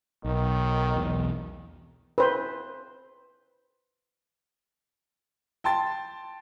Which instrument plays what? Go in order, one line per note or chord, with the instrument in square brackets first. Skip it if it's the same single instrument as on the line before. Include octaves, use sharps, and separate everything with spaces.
[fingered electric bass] B1 [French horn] D#3
[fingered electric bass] B1 E2
[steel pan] B4 C5
[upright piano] G5 A5 C6 A6